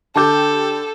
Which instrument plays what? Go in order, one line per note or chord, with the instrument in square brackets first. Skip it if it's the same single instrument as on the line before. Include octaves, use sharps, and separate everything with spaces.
[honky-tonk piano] D3 G4 G6 [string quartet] A4 [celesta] A5 D6